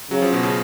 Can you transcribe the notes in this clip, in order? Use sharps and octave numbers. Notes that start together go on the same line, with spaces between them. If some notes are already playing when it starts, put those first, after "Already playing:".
C#3 F#3
F3
B2
C#3